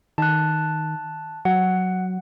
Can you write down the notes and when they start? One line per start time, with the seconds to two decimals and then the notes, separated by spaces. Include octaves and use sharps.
0.18 D#3 A5 F#6
1.45 F#3 F#5